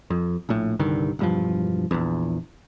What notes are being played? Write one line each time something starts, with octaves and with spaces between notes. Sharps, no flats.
F2
A#1 A2
C2 G2 D3 D#3
E1 G2 F3
A#1 E2